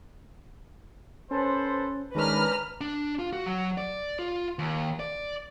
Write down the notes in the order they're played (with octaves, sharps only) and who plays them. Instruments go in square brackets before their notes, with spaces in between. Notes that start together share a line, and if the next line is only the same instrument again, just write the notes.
[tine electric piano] C#4 [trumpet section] A4 B4 C5
[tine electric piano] D#3 G#3 [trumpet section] C#4 D4 [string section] B4 A#5 F6
[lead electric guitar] D4
F4
F#4
F#3
D5
F4
D#2
D5